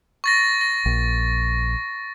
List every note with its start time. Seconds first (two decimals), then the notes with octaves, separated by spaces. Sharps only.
0.24 C#6 A6 A#6
0.61 A#6
0.86 A#1